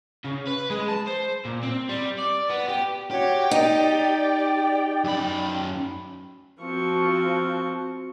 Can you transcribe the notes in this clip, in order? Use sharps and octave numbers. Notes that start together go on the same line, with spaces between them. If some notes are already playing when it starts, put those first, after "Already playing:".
C#3
B4
G#3
A5
C5
A#2
C4
G3
D5
B3
G4
F#4 G4 C#5
D#4 D5 G5
F#2 B5
F3 C4 F#4 C#6